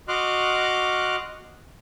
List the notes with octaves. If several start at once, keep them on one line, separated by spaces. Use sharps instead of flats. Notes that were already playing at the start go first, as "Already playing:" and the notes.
F#4 D#5 C6 D6 F6 F#6